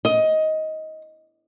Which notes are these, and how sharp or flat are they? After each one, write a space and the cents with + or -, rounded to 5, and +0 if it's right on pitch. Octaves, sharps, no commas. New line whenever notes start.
D#5 +15